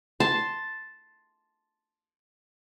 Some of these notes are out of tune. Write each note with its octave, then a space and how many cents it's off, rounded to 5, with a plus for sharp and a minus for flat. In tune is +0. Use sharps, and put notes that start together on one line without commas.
A5 +0 C6 +0